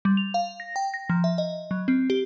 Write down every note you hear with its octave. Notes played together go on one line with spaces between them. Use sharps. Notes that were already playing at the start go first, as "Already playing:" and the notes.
G3
F7
F5
A#6
G5
A#6
F3
E5
D#5
F#3
C4
G4